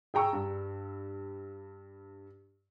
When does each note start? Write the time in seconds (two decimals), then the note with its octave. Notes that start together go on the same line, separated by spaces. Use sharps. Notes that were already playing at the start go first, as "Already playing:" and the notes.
0.14 G#4 G5 A#5 C#6 E6
0.33 G2